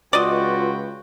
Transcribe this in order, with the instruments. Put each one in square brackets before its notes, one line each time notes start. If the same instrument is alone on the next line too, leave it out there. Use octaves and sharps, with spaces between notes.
[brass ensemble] C#2 B4 G5 [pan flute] F4 [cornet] F#4 [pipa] D5 D#5